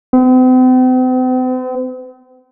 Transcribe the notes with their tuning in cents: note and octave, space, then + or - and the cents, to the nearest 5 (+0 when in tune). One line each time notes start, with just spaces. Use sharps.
C4 -45